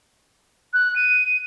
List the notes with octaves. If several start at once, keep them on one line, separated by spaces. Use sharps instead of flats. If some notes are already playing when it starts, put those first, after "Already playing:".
F#6
D#7